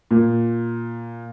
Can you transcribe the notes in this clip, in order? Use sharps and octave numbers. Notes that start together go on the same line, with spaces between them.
A#2